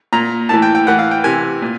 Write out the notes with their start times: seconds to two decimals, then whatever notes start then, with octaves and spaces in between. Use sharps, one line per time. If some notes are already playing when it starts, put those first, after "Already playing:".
0.13 A#2 A#5
0.49 A2 E3 A5
0.62 G5
0.75 G5
0.86 A2 E3 F#5
0.99 F5
1.11 G5
1.24 C3 E3 G#5
1.62 A#2